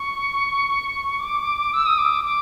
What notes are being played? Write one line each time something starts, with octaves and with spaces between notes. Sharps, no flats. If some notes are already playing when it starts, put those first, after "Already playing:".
Already playing: C#6
D6
E6
D#6
D6
D6